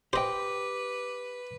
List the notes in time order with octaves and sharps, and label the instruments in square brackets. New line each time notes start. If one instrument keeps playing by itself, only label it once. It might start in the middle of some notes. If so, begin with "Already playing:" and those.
[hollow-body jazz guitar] G4 G5 [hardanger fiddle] B4 [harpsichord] C5 D#5 [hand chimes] D6